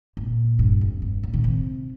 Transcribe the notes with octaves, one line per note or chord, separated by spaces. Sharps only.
A#2
G2
F2
G2
A#2
D#3
C3